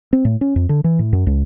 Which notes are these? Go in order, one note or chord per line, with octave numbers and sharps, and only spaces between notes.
C4
A2
C#4
F2
D3
E3
A2
F#2
C#2